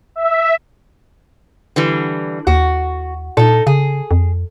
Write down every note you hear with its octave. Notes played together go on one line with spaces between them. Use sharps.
E5
D3 E3 G3
D#2 F#4
A#2 D#4 A4
C#3 G#4
F2